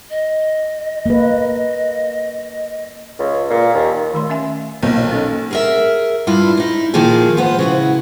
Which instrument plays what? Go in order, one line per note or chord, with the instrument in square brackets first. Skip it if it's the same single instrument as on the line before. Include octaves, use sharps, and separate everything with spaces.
[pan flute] D#5
[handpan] A#3 B4
[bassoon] C#2
A#2
D#2
[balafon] D#3 A3 C6
C#4 E5 G#5
[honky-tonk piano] B1 A#2 [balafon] D#4 C5
[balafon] C#4 A4
[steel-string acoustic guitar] G#4 A#4 E5
G2 D4 E4 F4
D#4 E4
A#2 D#3 F3 A#3 F4 G#4
F3 B3 C5
C#3 E4 F#4